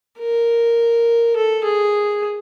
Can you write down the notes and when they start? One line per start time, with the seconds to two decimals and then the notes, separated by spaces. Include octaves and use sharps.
0.19 A#4
1.36 A4
1.64 G#4